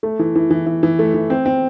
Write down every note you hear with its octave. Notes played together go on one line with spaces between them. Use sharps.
A3
E3
E3
E3
E3
E3
A3
E3
C4
C4